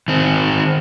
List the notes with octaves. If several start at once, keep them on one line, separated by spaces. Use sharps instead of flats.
D#3 C4